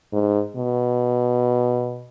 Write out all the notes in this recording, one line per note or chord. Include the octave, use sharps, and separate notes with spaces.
G#2
B2